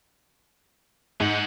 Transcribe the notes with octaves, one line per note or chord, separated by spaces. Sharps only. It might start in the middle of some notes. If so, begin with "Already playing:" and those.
G#2 G#3 F#5